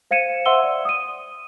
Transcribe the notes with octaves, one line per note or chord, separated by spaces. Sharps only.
C5 F5 G#6 C#7 D#7 E7
C5 E5 F#5 C6 E6 G7
D5
D#6 D#7